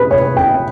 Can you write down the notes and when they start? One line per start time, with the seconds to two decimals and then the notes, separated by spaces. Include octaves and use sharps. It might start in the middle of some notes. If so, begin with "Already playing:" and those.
Already playing: G#4 B4
0.11 C#5
0.37 G5